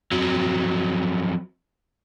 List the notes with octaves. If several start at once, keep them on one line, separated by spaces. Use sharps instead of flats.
F2 F#3